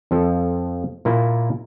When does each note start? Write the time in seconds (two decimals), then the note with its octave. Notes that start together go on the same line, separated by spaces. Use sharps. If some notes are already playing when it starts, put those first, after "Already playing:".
0.11 F2 F3 A4
1.05 A#2 A#3 E4